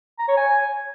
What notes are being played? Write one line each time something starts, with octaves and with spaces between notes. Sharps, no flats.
A#5
C#5
G#5